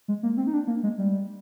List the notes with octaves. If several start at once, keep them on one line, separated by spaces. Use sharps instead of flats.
G#3
A#3
C4
D#4
D4
A#3
G#3
G3